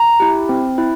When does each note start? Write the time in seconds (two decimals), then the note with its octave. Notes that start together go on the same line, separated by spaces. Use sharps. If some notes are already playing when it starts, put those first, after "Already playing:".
Already playing: A#5
0.20 E4 G4
0.49 C4
0.78 E4